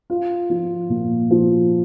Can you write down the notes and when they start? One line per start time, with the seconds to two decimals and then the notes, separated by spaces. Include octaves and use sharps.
0.10 F4
0.50 F3
0.89 A#2
1.31 F3